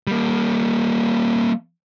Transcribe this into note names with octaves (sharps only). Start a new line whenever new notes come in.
G3 A#3